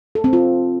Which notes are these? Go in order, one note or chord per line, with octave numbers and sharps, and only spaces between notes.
A4
C4
F4